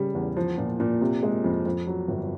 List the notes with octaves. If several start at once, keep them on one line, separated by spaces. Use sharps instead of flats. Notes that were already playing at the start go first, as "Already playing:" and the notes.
Already playing: C#3 G3
E2
F3
A#2
A#2
C3
G#3
F2
F2
F#3
G1